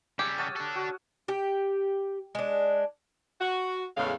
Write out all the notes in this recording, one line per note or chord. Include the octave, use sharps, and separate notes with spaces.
C#3 G3 G4 E6 G#6
C#5 F#5 A5 D#6 F6 D#7
D4 A4 F#6
F#4
G4
G#3 D4
F#4
E2 A2 C#3 G#3 F5